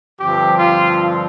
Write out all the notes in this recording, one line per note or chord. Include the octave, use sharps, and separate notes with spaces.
G2 D3 F3 C4 G4
F4